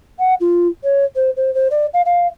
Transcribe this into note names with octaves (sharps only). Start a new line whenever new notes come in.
F#5
F4
C#5
C5
C5
C5
D5
F5
F5